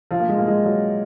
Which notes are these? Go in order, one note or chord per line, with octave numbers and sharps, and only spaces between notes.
F3
A#3
G#3
A#3
G#3
F#3